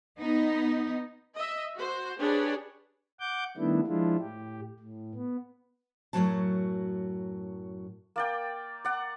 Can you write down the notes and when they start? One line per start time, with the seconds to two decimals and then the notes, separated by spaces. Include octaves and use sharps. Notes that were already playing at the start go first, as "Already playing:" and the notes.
0.18 B3 D#4
1.35 D#5 E5
1.75 F#4 C5
2.19 D4 G4 G#4 B4 C#5
3.20 F#5 D6 G6
3.57 D#3 G3 A3 B3 D4 E4
3.87 F3 G#3 D4 E4 F4
4.19 A2 G4
4.79 A2
5.14 B3
6.13 F#2 A2 C3 F#3 F#4 A5
8.16 A#3 D5 G5
8.85 D5 F#5